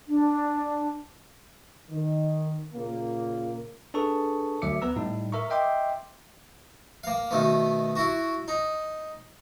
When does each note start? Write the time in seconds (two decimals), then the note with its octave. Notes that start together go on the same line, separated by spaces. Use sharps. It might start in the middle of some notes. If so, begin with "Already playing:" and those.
0.08 D4
1.90 D#3
2.74 A#2 C#3 A#3
3.94 D4 G#4 A4 B4 A5 C#6
4.62 D2 F#3 E5 D6 C#7
4.82 B3 B4 A#5 E6
4.96 A2 G3 D#4
5.32 A#4 E5 A#5 C#6
5.50 D#5 E5 G5 C6 D6
7.04 A#3 F5
7.31 B2 D#3 A3 B3
7.95 E4 F#4
8.48 D#4